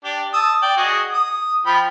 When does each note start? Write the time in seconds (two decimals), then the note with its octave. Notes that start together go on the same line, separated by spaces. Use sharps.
0.04 D4 G4
0.33 A5 D#6 E6
0.62 D5 G5
0.77 F#4 G#4 D#5
1.13 D#6
1.66 F3 G5 B5